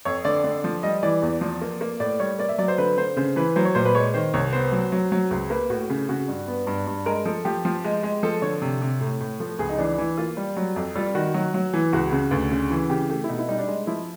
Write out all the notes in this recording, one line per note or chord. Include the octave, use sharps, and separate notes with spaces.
F2 C#5
D3 D5
D3
F3
G3 D#5
E3 D5
E2
F3
A#3
A#3
A2 D5
G3 C#5
A#3 D5
E5
F#3 D5
C5
D3 B4
D3 C5
C#3 C5
E3 B4
F#3 C5
C#5
A#2 C5
B4
G#3 C#5
D#3 C5
C2 C#5
B3 C5
F#3
F#3
F#3
C#2
A#3 B4
A2 F#4
C#3
C#3 F#4
G2
B3
G2
G2
G#3 A#4
F3 A4
F3 G4
F3
G#3
G#3
F3 A4
D3 C#5
C3
C3
A2
A2
F3 A4
C#2 G#4
D#4
E3 D4
E3
A#3 F4
G3
F#3
F2
G3 F4
D#3 F#4
F#3
F#3
E3
C#2 F#4
C#3
D2
C#3
E3
C#3 G4
A3 G4
E4
B2 D#4
E4
G3 D#4
D4
G#3
F3 E4